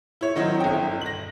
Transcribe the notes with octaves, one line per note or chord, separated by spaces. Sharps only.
E4 C#5
D#3 F#3 C4 D#4 E4
G1 G5
A#6 F#7